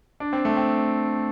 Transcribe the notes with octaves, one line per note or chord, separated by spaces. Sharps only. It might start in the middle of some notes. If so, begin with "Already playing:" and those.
D4
C4
A3
C4